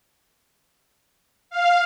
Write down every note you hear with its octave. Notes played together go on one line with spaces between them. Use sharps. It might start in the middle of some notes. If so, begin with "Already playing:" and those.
F5